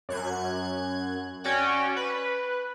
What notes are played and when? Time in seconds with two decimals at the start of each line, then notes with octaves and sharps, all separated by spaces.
0.09 F#2 F#6 G#6
1.44 C#4 F#4 D5 G5
1.97 B4